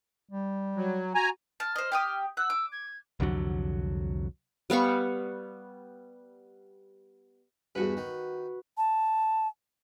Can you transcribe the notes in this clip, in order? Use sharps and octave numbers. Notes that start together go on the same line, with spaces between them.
G3
F#3
F#4 G#5 A#5
A5 F6
C5 D#5
G4 G5 D#6
F#5 E6
D6
G#6
C2 F2 D3 F#3
G3 B3 F5 C#6
E2 G2 F#4 B4
D#3
A5